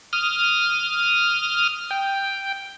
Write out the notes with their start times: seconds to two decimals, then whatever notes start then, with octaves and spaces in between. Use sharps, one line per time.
0.13 D#6 F6
1.91 G5